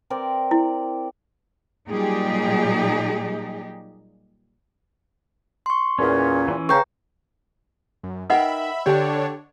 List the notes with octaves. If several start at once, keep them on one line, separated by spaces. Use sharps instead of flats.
C4 A#4 D5
E4
A#2 F#3 G3 D#4 G4 G#4
C6 C#6
E2 A#2 C#4
E3 C#4
C#3 B4 G5 A#5 C#6 G6
F#2
D#4 A#4 B4 D#5 E5 F#5 G5 B5
D3 D4 G4 A4 C#5 A5